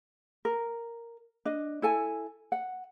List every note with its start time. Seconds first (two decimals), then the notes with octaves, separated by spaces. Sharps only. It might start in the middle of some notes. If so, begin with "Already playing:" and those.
0.45 A#4
1.45 D4 D#5
1.82 E4 A4 G#5
2.52 F#5